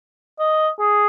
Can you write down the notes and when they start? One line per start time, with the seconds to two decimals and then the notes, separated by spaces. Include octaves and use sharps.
0.39 D#5
0.80 G#4